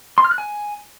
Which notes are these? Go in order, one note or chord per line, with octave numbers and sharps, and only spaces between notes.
C6
F6
F#6
G#5